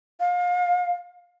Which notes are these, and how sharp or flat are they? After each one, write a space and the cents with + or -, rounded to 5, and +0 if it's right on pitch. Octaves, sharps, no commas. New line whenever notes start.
F5 +35